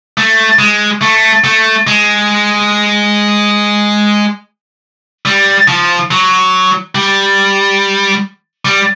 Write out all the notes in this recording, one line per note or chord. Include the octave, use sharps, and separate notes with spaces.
A3
G#3
A3
A3
G#3
G3
F3
F#3
G3
G3